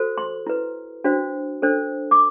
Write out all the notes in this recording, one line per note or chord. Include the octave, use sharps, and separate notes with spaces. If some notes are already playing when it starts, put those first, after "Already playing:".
Already playing: F#4 A4 C5
C6
E4 B4
D4 F#4 C5
D4 A4 C5
D6